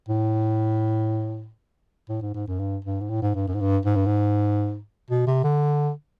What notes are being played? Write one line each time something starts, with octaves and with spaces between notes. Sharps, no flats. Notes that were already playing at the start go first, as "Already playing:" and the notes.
A2
A2
G#2
G#2
F#2
G2
G2
G#2
A2
G#2
G2
F#2
G#2
G2
G#2
G2
G#2
B2
C3
D3